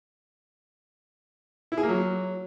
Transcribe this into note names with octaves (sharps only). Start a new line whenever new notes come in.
E4
G#4
A#3
F#3